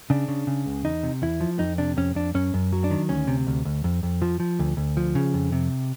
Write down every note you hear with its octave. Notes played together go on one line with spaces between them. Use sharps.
C#3 D4
C#3
C#3
C#2
E2 D#4
C3
E2 E4
F3
F2 D#4
C3 D4
F2 C#4
F2 D4
F#2 C#4
F#2
F#3
D4
D#3
D2 C#4
C3
D2
D2
F2
F2
F3
F3
D2
D2
F3
C#3
F2
C3